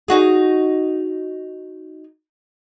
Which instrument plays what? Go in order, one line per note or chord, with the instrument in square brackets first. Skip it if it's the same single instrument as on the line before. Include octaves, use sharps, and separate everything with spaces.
[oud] D#4 F#4 G#4